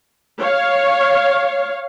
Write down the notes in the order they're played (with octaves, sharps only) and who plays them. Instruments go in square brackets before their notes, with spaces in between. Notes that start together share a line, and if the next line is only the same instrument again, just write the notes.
[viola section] C#5 F5